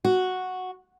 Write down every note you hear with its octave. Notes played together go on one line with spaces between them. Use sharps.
F#4